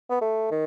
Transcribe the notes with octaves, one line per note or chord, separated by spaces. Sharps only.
B3
A3
D#3